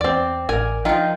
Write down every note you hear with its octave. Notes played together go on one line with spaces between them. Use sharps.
E2 C4 D5
A1 A#4 D5 G#5
D#3 F3 D#4 F4 G5